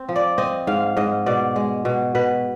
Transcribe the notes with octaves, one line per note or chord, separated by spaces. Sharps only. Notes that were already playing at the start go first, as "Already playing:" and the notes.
Already playing: C4
F3
D5
C4 D#5
G#2 F5
G#2 D#5
B2 D5
G#3
B2
B2 B4